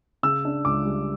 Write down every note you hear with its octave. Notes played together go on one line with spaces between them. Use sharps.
C#3 E6
D4
C#2 D6
G3